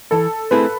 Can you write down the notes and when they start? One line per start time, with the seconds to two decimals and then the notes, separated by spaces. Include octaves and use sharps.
0.11 E3 A4
0.51 A3 C4 E4 G#4 B4